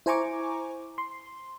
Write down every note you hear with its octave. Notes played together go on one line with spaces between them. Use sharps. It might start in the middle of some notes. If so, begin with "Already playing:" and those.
E4 C5 G#5 A#5 C#6 D6
C6